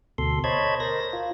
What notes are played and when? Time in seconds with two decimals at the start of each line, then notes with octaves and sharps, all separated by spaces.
0.18 D2 B2 A4 C6
0.44 C5 C#5 D#5 A5 B5 G#6
0.80 A#4 C5 A#6
1.13 F4